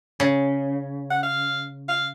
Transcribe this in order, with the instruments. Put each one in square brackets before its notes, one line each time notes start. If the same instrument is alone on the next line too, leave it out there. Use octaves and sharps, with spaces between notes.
[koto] C#3
[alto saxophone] F#5
F5
F5